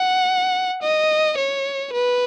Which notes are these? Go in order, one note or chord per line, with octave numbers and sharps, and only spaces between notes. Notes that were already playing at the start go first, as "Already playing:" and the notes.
Already playing: F#5
D#5
C#5
B4